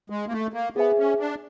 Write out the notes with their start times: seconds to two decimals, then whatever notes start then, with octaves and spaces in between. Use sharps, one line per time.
0.10 G#3
0.28 A#3
0.32 A3
0.54 A#3
0.76 B3 G#4 C5 E5 G#5
0.98 C#4
1.20 D4